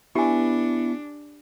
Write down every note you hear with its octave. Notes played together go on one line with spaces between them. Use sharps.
B3 D4 E4 G4 G#5